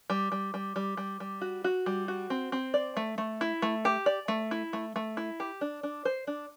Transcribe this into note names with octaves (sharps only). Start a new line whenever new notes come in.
G3
G3
G3
G3
G3
G3
F#4
F#4
G3
F#4
C4
C4
D5
A3
A3
E4
A3
G4
D5
A3
E4
A3
A3
E4
G4
D4
D4
C5
D4